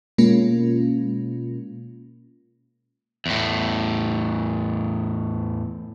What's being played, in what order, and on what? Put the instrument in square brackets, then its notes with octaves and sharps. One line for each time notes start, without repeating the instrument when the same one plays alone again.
[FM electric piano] B2 G#3 A#3 C#4 F4
[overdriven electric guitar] E2 A2